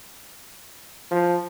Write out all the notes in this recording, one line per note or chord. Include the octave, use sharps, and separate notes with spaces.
F3